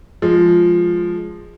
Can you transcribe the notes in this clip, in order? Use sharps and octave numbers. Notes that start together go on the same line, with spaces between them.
F3 G#3